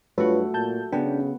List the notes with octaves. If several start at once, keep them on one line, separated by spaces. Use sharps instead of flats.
G2 A3 F4 F#4 B4 C#5
A#2 A5 G6
C#3 B3 C#4 D4 G5